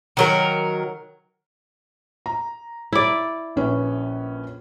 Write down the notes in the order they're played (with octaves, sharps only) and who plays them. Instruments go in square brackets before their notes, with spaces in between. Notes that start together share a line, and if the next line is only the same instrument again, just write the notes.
[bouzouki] D#3 F#3 A#4
[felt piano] A#5
[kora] E4 D5
[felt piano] A#1 C#4 B4